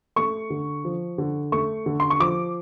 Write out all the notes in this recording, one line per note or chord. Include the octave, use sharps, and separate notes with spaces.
A3 C#6
D3
F3
D3
A3 C#6
D3
C6
C#6
F3 D6